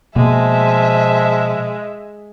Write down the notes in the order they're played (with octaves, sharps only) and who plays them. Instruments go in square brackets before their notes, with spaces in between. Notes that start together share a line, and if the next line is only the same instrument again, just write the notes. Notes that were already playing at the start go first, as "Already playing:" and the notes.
[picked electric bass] B2 A#3 [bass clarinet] F3 [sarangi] G#3 [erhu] E5